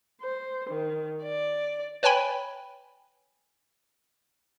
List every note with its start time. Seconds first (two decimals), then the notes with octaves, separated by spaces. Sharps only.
0.21 C5
0.71 D#3
1.23 D5
2.03 B4 C#5 G5 G#5 B5